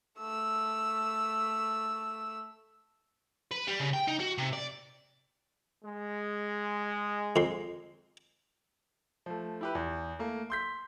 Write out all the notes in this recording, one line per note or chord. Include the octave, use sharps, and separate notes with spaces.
A3 E6
B4
G3
C#3
G5
D#4
F#4
C3
D5
G#3
F2 C6
F3 A3
E4 G4 B4
E2
A3 A#3
C6 G6 B6